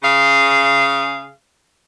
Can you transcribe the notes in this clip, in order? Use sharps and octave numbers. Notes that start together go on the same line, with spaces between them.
C#3 G#4 F5